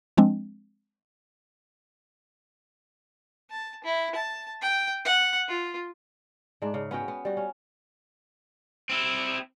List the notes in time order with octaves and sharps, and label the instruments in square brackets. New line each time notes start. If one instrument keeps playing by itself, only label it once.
[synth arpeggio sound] F3 G#3 C4 D4
[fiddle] A5
E4
A5
G5
F#5
F4
[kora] G#2 D4
C#3
B3 C#4 F#4 G5
B3
G3 F#4
C#4
[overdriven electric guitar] C4 E4